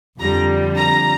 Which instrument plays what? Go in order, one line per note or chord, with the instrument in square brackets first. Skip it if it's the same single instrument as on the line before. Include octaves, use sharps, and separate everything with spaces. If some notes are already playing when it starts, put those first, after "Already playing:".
[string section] F2 D3 G3 A#5
A#5